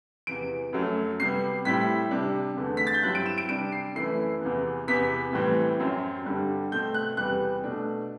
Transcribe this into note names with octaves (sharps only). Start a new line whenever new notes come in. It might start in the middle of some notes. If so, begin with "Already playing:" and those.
E2 C3 E3 D7
F#2 F#3 A3
C3 G3 B3 C7
A2 G3 C4 E4 B6
C3 G3 D4
E2 D3 A3
B6
A6
G6
G2 F#3 C4 E4 F#6
D7
E7
D7
C3 G3 D4 D7
C7
F#2 E3 A3 E4 C7
E2 C3 E3 B3
E2 C3 E3 B3 B6
A2 E3 G3 C4
F#2 F#3 C4
G2 D3 G3 D4
B2 A3 C4 G6
F#6
E2 C3 G3 B3 F#6
B2 A3 D4